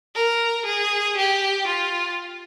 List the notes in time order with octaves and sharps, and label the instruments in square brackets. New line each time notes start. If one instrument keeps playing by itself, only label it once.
[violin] A#4
G#4
G4
F4